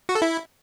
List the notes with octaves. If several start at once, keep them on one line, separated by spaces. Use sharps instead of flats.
F#4
A4
E4